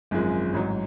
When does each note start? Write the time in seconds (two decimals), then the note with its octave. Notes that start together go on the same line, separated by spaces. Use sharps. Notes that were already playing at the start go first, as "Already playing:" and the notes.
0.11 G#1 F#2 F3 G#3
0.53 A1 G#2 F#3